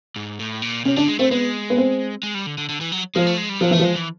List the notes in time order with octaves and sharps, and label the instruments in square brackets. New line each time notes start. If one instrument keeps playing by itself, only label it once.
[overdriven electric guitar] G#2
A2
A#2
[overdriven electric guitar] C3 [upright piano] C#4
[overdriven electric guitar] D3 [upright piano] D4
[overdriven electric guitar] G#3
[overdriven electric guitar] A3 [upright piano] C4
[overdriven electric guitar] G#3 [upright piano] B3
[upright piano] B3
C4
[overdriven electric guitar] G#3
G3
D3
D3
D3
E3
F#3
[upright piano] F3 [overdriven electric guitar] G#3
[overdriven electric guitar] A3
G#3
G3
[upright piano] F3 [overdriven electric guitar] F#3
[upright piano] E3 [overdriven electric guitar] A3
[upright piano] F3
[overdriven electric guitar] G#3
E3